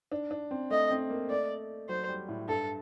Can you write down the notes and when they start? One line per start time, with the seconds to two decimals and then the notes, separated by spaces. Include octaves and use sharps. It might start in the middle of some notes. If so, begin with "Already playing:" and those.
0.12 D4
0.31 D4
0.51 C4
0.70 A3 D#5
0.91 C4
1.10 A#3
1.30 A3 D5
1.89 F#3 C5
2.08 G3
2.29 A2
2.48 G2 A4